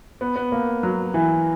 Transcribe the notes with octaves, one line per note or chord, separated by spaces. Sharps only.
B3
B3
A#3
F#3
E3